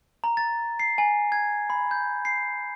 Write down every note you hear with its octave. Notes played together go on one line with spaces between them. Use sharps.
A#5
A6
C7
G#5
G#6
B5
G6
C7